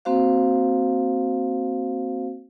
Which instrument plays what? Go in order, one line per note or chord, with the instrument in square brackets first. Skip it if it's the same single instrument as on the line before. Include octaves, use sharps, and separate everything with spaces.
[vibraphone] A#3 C4 F#4 C5 F5